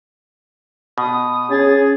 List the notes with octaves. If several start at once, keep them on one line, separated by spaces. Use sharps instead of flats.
B2 D#6
C#4 G#4 A6